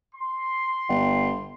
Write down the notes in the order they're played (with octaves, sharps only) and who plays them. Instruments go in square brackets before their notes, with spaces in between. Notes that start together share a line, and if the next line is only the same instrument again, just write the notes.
[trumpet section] C6
[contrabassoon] G1